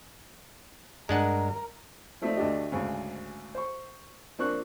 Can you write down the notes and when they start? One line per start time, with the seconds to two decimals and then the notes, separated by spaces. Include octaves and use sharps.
1.09 G2 G#3 D4 A#4 F#5
2.22 F3 A3 C4 D#4 F4 D5
2.37 D2 A3 D4 G4 D#5
2.72 D2 G#2 C#3
3.55 C5 C#6
4.39 F3 A#3 C4 D4 C#6 F#6